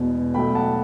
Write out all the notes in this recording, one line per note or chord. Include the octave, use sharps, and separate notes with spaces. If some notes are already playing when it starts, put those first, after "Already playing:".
Already playing: E1 E2 B2
B1 B2 A3 G5 B5
F#5 A5